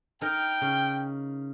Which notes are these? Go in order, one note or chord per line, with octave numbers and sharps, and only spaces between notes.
D#4 A#4 G5
C#3